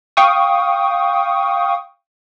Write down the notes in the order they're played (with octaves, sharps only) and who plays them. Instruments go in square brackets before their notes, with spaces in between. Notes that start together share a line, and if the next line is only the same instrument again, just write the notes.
[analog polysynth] F5 G5 C#6 D#6